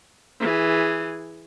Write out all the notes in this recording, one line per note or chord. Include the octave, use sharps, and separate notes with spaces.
E3 G#4